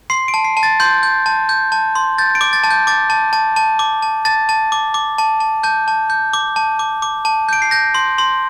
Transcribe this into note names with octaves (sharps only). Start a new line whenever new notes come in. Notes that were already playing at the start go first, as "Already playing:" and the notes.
C6 C7
D7
A5
C7
A5
A6
C6 G6
G6
A5
G6
A5
C6
G6 A6
D7
D6
A6
A5
G6
D6 A6
A5
A5
A5
D6
A5
A5 A6
A5
D6
D6
A5
A5
A5 G6
A5
G6
D6
A5
D6
D6
A5
G6 D7
C7
G6 A#6
C6
C6